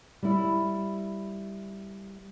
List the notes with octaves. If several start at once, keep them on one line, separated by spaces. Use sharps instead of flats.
G3 E4